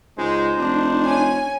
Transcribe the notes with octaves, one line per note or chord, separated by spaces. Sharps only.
C#2 G#3 D#4 C5
F1 D4
C#4 G#5